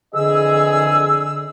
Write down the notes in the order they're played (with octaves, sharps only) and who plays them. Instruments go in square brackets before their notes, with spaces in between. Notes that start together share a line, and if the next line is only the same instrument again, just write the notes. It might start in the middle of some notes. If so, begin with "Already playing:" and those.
[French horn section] F2 E3 G#4 [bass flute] D3 [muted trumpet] D#5 [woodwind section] E6